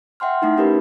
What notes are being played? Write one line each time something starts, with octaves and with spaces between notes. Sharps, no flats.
E5 F#5 G5 C6 F6
A3 D#4 E4
C#4 G4 A#4 B4 B5